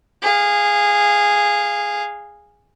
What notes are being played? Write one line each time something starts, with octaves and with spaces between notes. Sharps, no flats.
G#4 F5